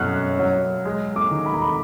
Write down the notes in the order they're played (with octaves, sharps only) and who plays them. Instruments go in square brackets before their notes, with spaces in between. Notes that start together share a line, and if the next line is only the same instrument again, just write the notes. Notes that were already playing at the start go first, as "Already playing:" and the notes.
Already playing: [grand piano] F#2 B2 [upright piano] F6 F#6
[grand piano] F#3
G#3
[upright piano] D6
[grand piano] D#3
[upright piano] B5
A#5
B5